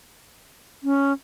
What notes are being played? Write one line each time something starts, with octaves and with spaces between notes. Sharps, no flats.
C#4